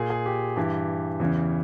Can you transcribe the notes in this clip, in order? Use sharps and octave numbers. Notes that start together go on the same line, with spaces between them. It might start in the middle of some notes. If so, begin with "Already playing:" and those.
Already playing: A#2 G#4
G#4
G4
G2 E3 G4
E2 C#3 E3